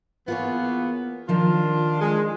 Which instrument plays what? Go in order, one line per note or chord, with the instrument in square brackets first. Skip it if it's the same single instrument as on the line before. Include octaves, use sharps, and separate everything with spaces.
[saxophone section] E3 A#3 B3 [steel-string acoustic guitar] F4 G#4 C#5
[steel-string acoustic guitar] D#3 F3 A#4 [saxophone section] D4 F4
[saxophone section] G#3